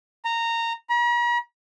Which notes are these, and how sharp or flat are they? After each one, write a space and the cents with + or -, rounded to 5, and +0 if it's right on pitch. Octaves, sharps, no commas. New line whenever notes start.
A#5 -15
A#5 +45